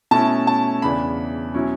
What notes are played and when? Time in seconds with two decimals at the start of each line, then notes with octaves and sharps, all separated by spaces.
0.11 B2 A3 C#4 E4 A5
0.47 A5
0.82 E2 C#3 E3 B3 D4 B5
1.54 B2 F#3 C#4 E4